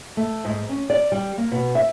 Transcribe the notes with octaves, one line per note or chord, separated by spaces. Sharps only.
A3
G#2
C#4
D5
G3
A#3
B2
E5